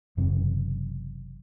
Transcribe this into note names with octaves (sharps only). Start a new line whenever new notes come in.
F#1 F#2 C3 E3